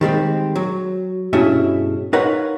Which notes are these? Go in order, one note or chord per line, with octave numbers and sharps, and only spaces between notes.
D#3 G3 G#3 C4
F#3
G2 B2 C#4 E4 G#4 E5
D#4 F4 A#4 B4 C#5 F#5